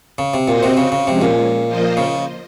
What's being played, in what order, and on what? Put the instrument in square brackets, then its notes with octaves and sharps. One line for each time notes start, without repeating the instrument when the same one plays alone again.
[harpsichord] C#3
C3
[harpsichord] A#2 [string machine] C4 F#4 C5 D#5
[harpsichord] C3
C#3
C#3
[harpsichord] C3 [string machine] F3 G#3 C#4
[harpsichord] A#2
[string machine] F3 A#3 F4 C5 D#5
[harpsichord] C#3